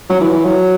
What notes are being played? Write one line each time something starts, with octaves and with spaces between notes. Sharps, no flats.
F#3
E3
E3
F#3